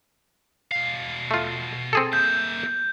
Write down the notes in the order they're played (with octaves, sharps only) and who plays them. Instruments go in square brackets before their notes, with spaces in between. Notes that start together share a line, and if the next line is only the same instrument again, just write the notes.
[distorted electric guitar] B2 F5
[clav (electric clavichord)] A3 F4
C4 G#4 A4
[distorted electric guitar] A#3 E5 [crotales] G6